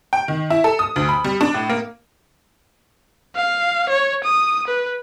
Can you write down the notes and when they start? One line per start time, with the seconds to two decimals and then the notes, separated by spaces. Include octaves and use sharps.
0.13 G5
0.28 D#3
0.50 E4
0.64 A4
0.79 D#6
0.96 D2
1.09 B5
1.24 G3
1.41 D4
1.54 A2
1.70 A#3
3.36 F5
3.89 C#5
4.24 D#6
4.67 B4